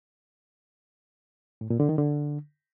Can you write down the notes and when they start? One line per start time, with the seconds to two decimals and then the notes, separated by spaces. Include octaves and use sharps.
1.61 A2
1.70 A#2
1.80 D3
1.89 D#3
1.98 D3